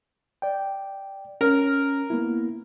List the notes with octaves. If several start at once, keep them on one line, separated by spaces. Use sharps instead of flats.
D5 G5
C#4 A#4
A#3 B3 E4